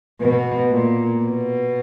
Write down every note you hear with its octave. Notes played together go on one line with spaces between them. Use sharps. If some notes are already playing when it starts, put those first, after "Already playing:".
B2
A#2
B2